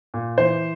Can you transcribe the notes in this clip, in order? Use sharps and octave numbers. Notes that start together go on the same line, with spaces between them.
A#2
E3 C5